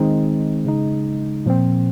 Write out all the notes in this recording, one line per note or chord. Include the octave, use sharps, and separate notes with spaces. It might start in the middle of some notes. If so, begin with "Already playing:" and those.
Already playing: D#3 G#3 C4 D#4
C#3 G#3 D#4
A#2 F3 C4